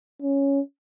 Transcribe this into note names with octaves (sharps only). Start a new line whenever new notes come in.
C#4